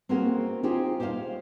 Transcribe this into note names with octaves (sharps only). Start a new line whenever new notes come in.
A#3 C4 C#4 F#4 G#4 A#4
D#4 F4 G4 G#4 C5
G4 C5 C#5 E5 F5